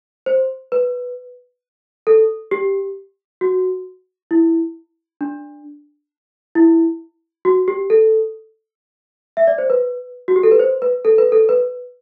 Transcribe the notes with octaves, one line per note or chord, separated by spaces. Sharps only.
C5
B4
A4
G4
F#4
E4
D4
E4
F#4
G4
A4
E5
D5
C5
B4
F#4
G4
A4
B4
C5
B4
A4
B4
A4
B4